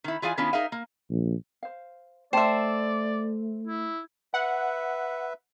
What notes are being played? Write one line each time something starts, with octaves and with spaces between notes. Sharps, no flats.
D#3 E4
E3 F4 G#4 D5 F5 G#5
D#3 B3 C#4 D4 E4 F4
D#4 G#4 A#4 E5 F5
A#3
A#1
C5 F5
A3 C5 D5 E5 G5 A5
E4
B4 E5 F#5